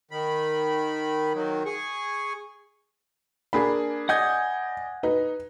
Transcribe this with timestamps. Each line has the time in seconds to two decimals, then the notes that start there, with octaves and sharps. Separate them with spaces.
0.11 D#3 B5
1.34 D#3 F#3
1.66 G#4 C#6
3.53 A#3 D4 G#4 B5
4.09 D5 D#5 F#5 G#5 G6 G#6
5.03 D#4 B4